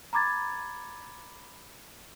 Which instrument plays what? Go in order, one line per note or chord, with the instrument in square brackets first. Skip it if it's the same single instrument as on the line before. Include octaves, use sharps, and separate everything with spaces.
[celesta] A#5 B5 D6 G#6 A6